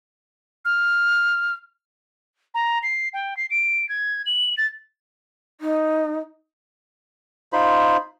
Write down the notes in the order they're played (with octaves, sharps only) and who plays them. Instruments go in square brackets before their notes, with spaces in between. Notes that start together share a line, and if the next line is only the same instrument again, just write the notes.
[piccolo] F6
A#5
C7
G5
C7
D7
G#6
F#7
A6
[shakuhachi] D#4
[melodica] D#4 F4 C5 B5